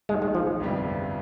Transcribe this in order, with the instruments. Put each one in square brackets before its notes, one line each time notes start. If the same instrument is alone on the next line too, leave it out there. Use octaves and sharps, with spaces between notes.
[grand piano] A#1 G#2 D#3 [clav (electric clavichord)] G#3
[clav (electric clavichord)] G#3
F3
[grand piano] G1 F2 C3 G3